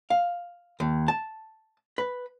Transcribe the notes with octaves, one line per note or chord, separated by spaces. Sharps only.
F5
D#2
A5
B4